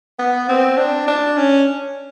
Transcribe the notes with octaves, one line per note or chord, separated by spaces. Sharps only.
B3
C4
D4
D4
C#4